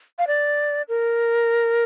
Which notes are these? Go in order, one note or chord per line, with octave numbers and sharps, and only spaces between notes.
F5
D5
A#4